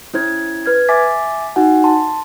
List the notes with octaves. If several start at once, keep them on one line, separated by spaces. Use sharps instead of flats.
C#4 E4 C5 G#6
B4 F6 G#6
E5 G#5 D6 A6 B6
D#4 F#4 F#5 G#5
A5 C6